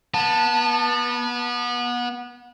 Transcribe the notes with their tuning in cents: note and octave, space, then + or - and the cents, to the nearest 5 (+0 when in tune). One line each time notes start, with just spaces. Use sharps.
B3 -25 A5 +10